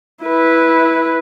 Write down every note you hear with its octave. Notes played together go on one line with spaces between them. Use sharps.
E4 B4